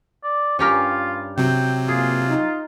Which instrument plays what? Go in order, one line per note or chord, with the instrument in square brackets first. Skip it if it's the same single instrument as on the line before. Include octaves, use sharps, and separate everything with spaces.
[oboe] D5
[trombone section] G2 [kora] C#4 G4 A#4 [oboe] F4
[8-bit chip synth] C3 F#3 [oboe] G5
[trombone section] G2 A#3 [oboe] F4 [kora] G#4
[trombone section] D#4